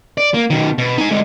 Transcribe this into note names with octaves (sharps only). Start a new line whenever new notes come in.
D5
A#3
B2 D#3
B2
D#4 G#5
D3 G#3